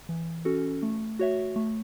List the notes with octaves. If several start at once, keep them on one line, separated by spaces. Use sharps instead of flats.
E3
C#4 F#4 A4
A3
F#4 C#5 E5
A3